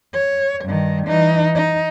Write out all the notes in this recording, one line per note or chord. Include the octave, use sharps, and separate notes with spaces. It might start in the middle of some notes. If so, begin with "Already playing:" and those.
C#5
G2 D#3
E3 D#4
D#4